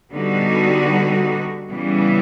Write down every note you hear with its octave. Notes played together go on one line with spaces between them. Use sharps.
D3 G3 B3 D#4 F#4
C#3 E3 G3 B3